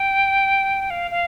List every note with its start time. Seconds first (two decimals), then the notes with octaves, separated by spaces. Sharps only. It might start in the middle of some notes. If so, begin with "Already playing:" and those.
Already playing: G5
0.90 F5
1.11 F5